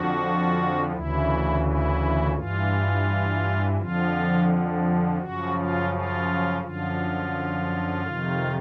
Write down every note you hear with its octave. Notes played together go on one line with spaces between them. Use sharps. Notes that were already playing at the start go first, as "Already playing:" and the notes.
Already playing: F2 D3 F3 F#4
D2 C#3 E3 E4
E4
G2 E3 F4
F2 D3 F3 F4
F#2 C#3 F3 F#4
F4
F4
F#2 D3 F3 F4
F2 C3 D#3